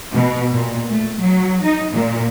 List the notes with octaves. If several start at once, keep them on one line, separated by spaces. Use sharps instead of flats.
B2
A#2
A3
F#3
D#4
A#2